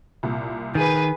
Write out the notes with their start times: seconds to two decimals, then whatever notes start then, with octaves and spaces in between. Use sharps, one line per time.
0.23 C2 A#2
0.75 D#3 G#4 B4